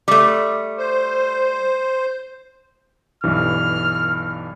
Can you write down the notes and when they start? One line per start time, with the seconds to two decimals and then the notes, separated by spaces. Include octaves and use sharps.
0.08 G3 A3
0.78 C5
3.24 B1 G2 E3 F6